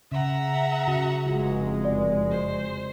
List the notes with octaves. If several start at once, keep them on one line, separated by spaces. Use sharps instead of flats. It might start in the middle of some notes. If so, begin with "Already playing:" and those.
C#3 E5 F#5 A#5
C#3 F#4
F1 G#3 F4 F#4
D5
C5